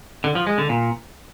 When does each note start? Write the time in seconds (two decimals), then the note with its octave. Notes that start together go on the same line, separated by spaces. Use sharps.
0.24 D3
0.35 F3
0.47 G#3
0.58 D3
0.69 A#2